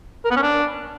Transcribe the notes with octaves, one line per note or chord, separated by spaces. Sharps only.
A#4
B3
C#4
D4